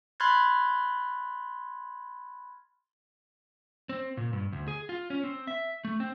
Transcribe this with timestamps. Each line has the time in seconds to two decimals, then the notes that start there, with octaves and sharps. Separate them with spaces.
0.20 B5 C6 F6 F#6 G#6 A6
3.89 C4
4.17 A#2
4.33 G2
4.52 D2
4.68 G#4
4.89 F4
5.10 C#4
5.24 C4
5.47 E5
5.85 A3
6.00 C4